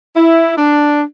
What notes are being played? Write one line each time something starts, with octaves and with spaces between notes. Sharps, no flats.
E4
D4